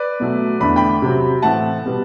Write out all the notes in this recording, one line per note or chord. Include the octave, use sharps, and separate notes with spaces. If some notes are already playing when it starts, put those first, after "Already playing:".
Already playing: B4 D5
B2 F#3 A3
E2 D3 A3 D4 B5
G5 B5
C3 F#3 C4
A2 E3 A3 C4 F#5 A5
B2 G3 B3